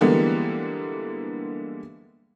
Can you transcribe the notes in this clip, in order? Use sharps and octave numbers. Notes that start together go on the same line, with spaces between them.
D3 E3 G3 G#3 A#3 B3